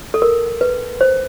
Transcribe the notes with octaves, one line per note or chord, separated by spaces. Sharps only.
A4
A#4
B4
C5